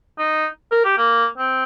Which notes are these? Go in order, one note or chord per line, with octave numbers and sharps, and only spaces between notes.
D#4
A#4
G4
A#3
C4